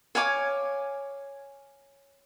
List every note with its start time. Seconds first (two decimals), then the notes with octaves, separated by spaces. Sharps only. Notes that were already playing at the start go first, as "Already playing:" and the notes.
0.15 C#5 F5 G#5 D6